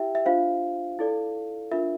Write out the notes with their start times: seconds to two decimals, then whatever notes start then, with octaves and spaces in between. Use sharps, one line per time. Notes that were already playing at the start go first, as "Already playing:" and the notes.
Already playing: E4 G4 E5 G5
0.15 E5
0.25 D4 F4 C5 F5
0.99 E4 A4 D5
1.71 D4 F4 A#4 E5